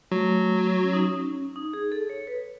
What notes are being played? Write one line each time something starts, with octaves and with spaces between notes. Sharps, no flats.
F#3 A3
C#4
D#4
C#4
D#4
G#4
A4
C#5
B4